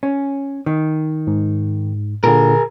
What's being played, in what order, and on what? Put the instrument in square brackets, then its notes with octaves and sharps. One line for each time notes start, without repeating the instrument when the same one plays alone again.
[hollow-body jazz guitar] C#4
D#3
[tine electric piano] G#2
[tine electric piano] A#2 D3 [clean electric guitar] G#4 A#4